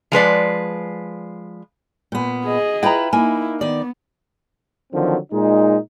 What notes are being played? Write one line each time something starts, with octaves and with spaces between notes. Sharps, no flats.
F3 G#3 B4 D5
A#2 B3
G#4 D#5
E4 F4 B4 G5 A#5
A#3 D#4 E4 G#5
D#3 B3 D5
D3 D#3 F3 F#3 C4
A#2 G#3 D#4